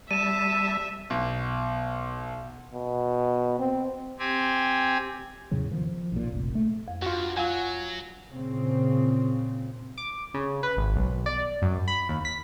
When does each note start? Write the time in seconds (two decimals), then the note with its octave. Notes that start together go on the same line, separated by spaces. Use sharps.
0.11 G3 E5 A5 D#7 E7
1.10 B1
2.74 B2
3.59 C4
4.19 C4 G4 G#5
5.51 E2 A2 C#3 F#3
5.71 D#3 F3
5.87 F3
6.12 B1 A#2
6.32 F1 A#1
6.55 A3
6.88 F2
7.02 G2 F4 F#4
7.37 F#3 F4 F5 F#5 G#5
8.32 A#2 C#3 C4
9.98 D6
10.34 C#3
10.63 B4
10.77 G#1
10.97 B1
11.26 D5
11.62 F#2
11.88 B5
12.09 D#2
12.25 B6